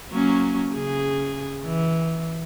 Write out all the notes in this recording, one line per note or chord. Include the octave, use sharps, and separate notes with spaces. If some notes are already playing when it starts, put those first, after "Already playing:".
F#3 A#3 C#4
C#3 G#4
E3